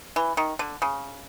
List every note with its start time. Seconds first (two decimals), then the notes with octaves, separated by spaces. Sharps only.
0.16 E3
0.37 D#3
0.59 D3
0.82 C#3